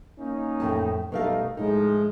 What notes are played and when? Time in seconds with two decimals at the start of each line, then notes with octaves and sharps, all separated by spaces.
0.19 A#3 C#4 D#4
0.60 F2 A2 A5
1.12 B2 G3 A3 D#4 A#4 F5
1.57 A2 F3 G#3 D#4